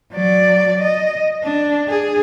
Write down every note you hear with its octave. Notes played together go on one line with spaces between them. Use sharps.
F#3 D5
D#5
D4
G#4